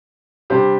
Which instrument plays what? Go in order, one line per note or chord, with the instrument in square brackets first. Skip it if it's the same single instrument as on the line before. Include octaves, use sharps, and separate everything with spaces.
[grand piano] C3 G3 D4 G4 C5